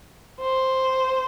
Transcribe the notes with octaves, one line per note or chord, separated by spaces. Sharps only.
C5